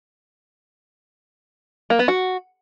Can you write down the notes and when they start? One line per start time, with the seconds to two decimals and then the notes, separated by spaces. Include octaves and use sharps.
1.90 A#3
1.99 B3
2.08 F#4